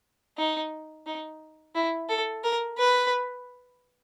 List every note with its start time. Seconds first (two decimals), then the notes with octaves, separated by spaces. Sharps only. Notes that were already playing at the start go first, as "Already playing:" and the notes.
0.38 D#4
1.06 D#4
1.75 E4
2.09 A4
2.44 A#4
2.78 B4